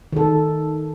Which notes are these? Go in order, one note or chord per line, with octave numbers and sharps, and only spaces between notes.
D#3 A4